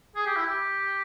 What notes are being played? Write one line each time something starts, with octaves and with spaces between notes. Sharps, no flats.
G#4
G4
E4
G4